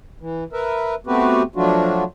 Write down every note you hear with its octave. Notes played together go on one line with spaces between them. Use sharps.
E3
A#4 B4 E5
A3 B3 C4 F#4 G4 B4
F3 F#3 A3 D4 F4 F#4